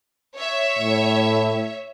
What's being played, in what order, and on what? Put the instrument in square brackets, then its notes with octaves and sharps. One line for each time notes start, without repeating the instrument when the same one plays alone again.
[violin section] C#5 E5
[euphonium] A2